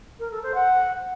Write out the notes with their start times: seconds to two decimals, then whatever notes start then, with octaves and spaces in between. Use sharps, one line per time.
0.19 A#4
0.31 A4
0.42 C5
0.54 F#5